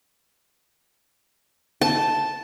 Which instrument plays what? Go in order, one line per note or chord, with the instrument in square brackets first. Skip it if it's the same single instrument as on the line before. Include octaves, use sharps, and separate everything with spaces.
[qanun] A5